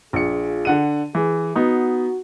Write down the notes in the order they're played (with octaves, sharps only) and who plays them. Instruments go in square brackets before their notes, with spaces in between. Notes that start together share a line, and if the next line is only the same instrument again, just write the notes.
[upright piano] A#1 C#7 [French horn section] F4 G#4
[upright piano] D3 F#5 D#7
[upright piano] E3 [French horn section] G#4
[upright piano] B3 D#4 [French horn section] F#4